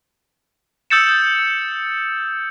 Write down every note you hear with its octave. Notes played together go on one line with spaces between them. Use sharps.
D#6 E6 G6 A6 C#7 E7